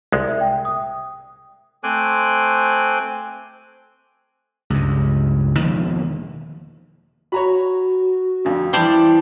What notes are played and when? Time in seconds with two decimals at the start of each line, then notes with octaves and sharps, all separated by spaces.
0.12 C2 G#3
0.28 E5
0.41 G5
0.65 D#6
1.84 A3 C4 C5 G#5 D6 F#6
4.70 C#2 G2
5.58 E1 D#3 F3 A#3
7.32 F#4 C#5 A#5 B5
8.45 F2 D3
8.73 E3 G3 C5 D5 A5